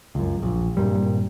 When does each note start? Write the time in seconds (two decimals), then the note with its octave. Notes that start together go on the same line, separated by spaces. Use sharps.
0.15 C#2 F#2
0.42 A#1
0.77 G#1 G2 A#2 G3